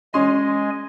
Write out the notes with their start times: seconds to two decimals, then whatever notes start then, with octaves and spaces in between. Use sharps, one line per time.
0.14 G#3 C#4 D#5 G#5 C6